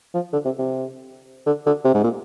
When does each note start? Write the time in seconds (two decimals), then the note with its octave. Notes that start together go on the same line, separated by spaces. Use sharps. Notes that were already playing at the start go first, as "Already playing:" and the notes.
0.14 F3
0.33 D3
0.45 C3
0.59 C3
1.47 D3
1.67 D3
1.85 C3
1.94 G#2
2.04 A#2